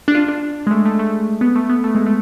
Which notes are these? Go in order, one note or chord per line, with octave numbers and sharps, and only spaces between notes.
D4
F4
D4
G#3
A3
A3
A3
B3
A3
B3
A3
G#3
A3